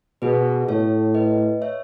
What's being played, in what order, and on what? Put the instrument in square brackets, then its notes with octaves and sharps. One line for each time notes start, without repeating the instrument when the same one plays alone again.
[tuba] B2 [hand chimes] G#4 B4
[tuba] A2 [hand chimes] A4 C#5
[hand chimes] B4 D#5
C#5 E5